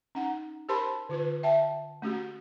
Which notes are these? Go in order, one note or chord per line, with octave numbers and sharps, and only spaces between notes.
C#4 D#4 F#5
G4 A#4 C5 A5 B5 C6
D3 F4 B4
E5 G5 A5
A3 C#4 F#4 G4